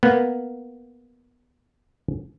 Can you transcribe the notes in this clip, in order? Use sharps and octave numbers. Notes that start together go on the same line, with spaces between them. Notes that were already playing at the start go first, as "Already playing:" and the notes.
A#3 B3